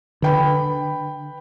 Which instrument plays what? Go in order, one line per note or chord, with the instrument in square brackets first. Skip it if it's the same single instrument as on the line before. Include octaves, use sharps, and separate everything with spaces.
[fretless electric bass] D3 [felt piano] B4 G5 B5